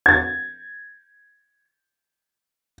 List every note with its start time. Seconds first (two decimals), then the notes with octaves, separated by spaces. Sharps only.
0.06 G#6 A6